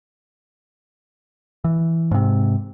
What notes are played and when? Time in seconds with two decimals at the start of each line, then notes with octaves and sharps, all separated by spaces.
1.64 E3
2.11 G#2 C3